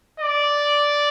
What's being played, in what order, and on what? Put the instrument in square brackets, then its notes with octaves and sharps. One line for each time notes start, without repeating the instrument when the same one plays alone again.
[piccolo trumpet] D5